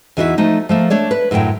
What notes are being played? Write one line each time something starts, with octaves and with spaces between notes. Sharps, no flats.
E2 E3 D#4 F#4 C5 E5
F3 A3 D#4
F3 A3 A#3
A3 D4 C#5 D5
B4
F#2 A2 D3 F#3 G5